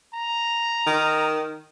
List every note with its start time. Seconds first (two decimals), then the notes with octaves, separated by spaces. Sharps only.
0.14 A#5
0.87 D#3